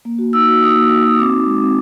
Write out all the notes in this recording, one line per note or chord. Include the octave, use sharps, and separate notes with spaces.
A#3
F#4
D#4 E6
F#4
D#4 D#6
A#3
F#4
F#4 D#6
C4 D6
D#4
G#3
C4